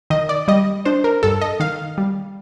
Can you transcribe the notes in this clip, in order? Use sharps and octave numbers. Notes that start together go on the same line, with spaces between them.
D#3 D#5
D5
G3 D#5
D4 C5
A#4
G2 A4
D#5
D#3 F5
G3